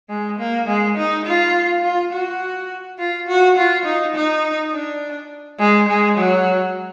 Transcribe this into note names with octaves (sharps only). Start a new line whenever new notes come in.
G#3
A#3
G#3
D#4
F4
F4
F#4
F4
F#4
F4
D#4
D#4
D4
G#3
G#3
F#3